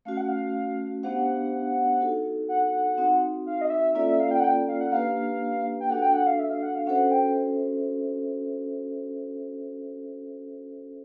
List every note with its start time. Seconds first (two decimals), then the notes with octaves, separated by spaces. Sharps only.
0.05 A3 C#4 F#4 F5
0.17 F#5
0.28 F5
1.03 B3 D4 G4 C5 F5 F#5
2.00 D#4 F#4 A4
2.48 F#5
2.98 C4 D#4 F#4
3.46 F5
3.61 D#5
3.70 E5
3.95 A#3 C#4 F4 A4 D5 E5
4.07 E5
4.20 F5
4.31 G5
4.40 F#5
4.44 G5
4.68 F5
4.80 F#5
4.92 A#3 D4 G4 B4 F5
5.80 G5
5.89 D4 F#4 A4 F#5
6.02 G5
6.13 F#5
6.26 F5
6.39 E5
6.50 F5
6.63 F#5
6.75 F5
6.87 C#4 F#4 A4 C5 E5 F#5
7.11 G5